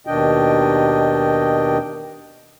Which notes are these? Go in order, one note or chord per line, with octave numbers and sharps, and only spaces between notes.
D#2 B2 D#3 D4 D#5 G5